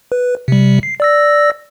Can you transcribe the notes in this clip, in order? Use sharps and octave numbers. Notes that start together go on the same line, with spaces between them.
B4
C3 G3
C7
D5 E6 A#6